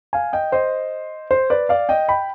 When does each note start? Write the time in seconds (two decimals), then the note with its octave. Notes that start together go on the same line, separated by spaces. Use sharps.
0.13 F5 G#5
0.33 D#5 G5
0.52 C5 D#5
1.31 C5
1.50 B4 D5
1.69 D5 F5
1.89 D#5 G5
2.08 G5 B5